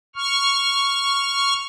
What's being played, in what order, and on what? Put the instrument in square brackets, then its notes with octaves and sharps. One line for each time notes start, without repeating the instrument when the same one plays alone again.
[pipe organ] C#6 F6